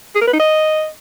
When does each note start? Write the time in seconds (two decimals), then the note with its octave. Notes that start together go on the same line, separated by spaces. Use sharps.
0.15 G#4
0.21 A#4
0.27 B4
0.33 D#4
0.40 D#5